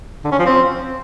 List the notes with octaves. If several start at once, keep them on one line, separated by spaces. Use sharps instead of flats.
D3
C#4
F3
C4